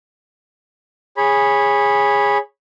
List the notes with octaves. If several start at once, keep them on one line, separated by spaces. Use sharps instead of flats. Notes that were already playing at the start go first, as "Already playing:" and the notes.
G#4 C#5 B5